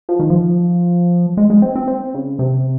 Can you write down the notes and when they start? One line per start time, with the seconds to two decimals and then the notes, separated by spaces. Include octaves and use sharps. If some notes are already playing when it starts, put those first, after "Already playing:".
0.09 F3
0.20 D#3
0.30 F3
1.37 G#3
1.50 G#3
1.62 C4
1.76 C4
1.88 C4
2.14 C#3
2.39 C3